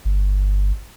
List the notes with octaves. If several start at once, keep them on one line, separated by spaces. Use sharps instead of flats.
G1